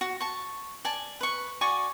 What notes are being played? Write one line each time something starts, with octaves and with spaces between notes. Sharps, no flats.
F#4
A5 C#6
D5 G#5 A5
B4 C#6
F#4 D5 G#5 C#6